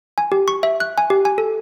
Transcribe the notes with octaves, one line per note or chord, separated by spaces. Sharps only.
G#5
G4
C#6
E5
F#6
G#5
G4
G#5
A4